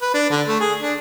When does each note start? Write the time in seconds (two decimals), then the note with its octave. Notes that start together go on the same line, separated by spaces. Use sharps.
0.02 B4
0.14 D4
0.30 D3
0.48 A3
0.60 G#4
0.82 D4